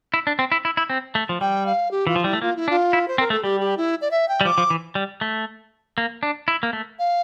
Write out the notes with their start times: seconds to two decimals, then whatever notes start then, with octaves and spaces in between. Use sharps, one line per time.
0.14 E4
0.27 D4
0.39 C4
0.52 E4
0.65 E4
0.77 E4
0.90 C4
1.15 A3
1.29 F3
1.41 G3 G5
1.66 F5
1.91 G4
2.07 E3 F4
2.16 F3
2.24 G3 E4
2.33 A3
2.42 A#3 F4
2.56 E4
2.68 D4 F4
2.93 E4
3.08 C5
3.18 C4 A#4
3.30 A3 A4
3.43 G3 G4
3.60 G4
3.77 E4
4.01 D5
4.11 E5
4.28 G5
4.41 G3
4.45 F3 D6
4.58 F3
4.70 E3
4.95 G3
5.21 A3
5.98 A#3
6.23 D4
6.48 E4
6.63 A#3
6.73 A3
6.99 F5